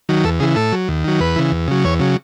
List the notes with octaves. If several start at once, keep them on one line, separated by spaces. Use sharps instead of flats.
D#3 F#3
E2 A4
C#3 E3 G#4
A2 A4
F#3
D#2
D#3 F#3
E2 B4
C#3 E3
E2
C#3 F#3
E2 C#5
C#3 F#3